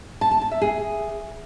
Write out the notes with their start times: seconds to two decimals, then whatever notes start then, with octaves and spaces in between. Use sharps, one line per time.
0.21 A5
0.31 A5
0.41 A5
0.51 E5
0.61 G#4